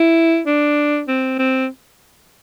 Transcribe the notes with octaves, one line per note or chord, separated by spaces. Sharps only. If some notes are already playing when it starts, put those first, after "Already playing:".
Already playing: E4
D4
C4
C4